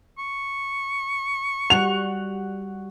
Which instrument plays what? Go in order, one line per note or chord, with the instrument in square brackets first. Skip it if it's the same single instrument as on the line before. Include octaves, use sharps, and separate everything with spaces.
[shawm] C#6
[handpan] G3 F#4 F#5 [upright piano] F7